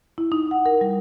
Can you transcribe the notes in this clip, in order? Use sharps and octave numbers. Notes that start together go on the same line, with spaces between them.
E4
D#4
F#5
A#4
G3